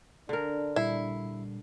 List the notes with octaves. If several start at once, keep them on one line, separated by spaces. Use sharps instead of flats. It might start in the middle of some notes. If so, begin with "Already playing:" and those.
D3 D4 A#4
A#2 G3 E4 C7